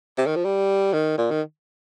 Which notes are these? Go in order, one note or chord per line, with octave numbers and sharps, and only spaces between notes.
C3
D#3
F3
G3
D#3
A#2
D#3